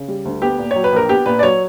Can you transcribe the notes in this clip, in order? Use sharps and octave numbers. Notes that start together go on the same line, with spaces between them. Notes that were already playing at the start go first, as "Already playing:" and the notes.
Already playing: C#3
G3
D2
B3 G4
A#2
C#5
F#3
B4
A#1 A#4
B3 G4
A#2 B4
D5
F#3 C#5